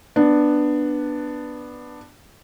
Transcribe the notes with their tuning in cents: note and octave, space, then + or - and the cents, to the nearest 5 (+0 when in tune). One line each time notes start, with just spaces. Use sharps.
B3 +0 D4 +10